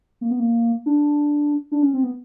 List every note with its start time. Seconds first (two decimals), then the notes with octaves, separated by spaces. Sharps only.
0.21 A#3
0.31 B3
0.40 A#3
0.86 D4
1.72 D4
1.82 C#4
1.93 C4
2.04 B3